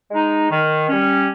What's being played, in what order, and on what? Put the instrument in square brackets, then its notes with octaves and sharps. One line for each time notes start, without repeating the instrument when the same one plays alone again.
[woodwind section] G#3 D#4
D#3
G3 C#4